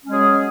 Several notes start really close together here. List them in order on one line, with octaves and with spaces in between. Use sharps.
C#4 G#3 F#3 G#4